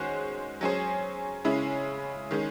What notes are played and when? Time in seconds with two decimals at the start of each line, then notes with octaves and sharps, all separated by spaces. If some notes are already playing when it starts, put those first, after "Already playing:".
Already playing: D#3 G#3 C#4 F#4 C5
0.61 F#3 C#4 G#4 C5
1.45 C#3 G#3 C#4 E4
2.31 D#3 G#3 C#4